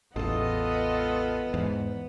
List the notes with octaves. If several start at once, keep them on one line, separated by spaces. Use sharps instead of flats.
A1 E2 B3 F4 A4 D#5
E2 G#2